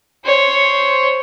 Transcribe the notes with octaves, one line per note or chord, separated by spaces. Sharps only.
C5 C#5